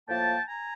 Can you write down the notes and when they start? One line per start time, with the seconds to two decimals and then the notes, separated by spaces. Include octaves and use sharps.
0.07 A2 F3 A#3 G5 A5
0.46 G#5 A#5